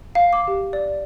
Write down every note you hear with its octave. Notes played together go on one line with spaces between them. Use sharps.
F5
D6
G4
D5